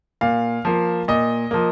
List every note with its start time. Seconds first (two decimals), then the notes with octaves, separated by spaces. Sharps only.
0.21 A#2 F5
0.65 F3 A#3
1.08 A#2 D#5
1.51 F3 A#3